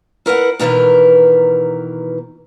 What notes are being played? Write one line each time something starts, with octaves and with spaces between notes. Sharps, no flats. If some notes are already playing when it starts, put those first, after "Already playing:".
E4 A#4 B4 F#5
B2 D#3 E3 A#4 B4